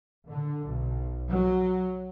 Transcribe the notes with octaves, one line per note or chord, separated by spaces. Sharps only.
D3
B1
F#3